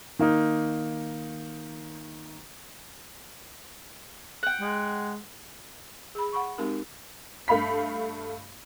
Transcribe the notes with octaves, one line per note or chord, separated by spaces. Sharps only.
D#3 A#3 D#4
F#5 G5
G#3
G#4 B5
F#5 B5 C#6
G#3 C4 D#4 G4 A#4
G2 A3 F5 B5 B6